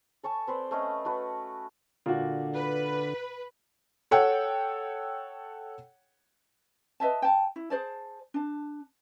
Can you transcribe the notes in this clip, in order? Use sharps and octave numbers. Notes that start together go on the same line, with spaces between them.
A4 C#5 G#5 A5
C4 B4 C5 D5
A3 C#4 D#5 F5
A3 F#4 B4
A#2 D3 F#4
B4
A4 C#5 F#5 G5
B4 D#5 E5 A5
G5 A5
E4
G#4 C5 D5 A5
D4 A5